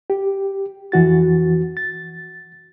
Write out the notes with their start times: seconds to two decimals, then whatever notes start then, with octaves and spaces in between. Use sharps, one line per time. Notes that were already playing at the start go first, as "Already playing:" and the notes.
0.10 G4
0.92 F2 E3 F#4 A6
1.77 A6